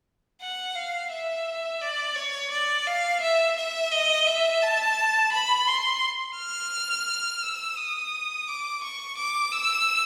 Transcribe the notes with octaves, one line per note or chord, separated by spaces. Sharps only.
F#5
F5
E5
D5
C#5
D5
F5
E5
E5
D#5
E5
A5
B5
C6
F6
E6
D#6
D6
C#6
D6
E6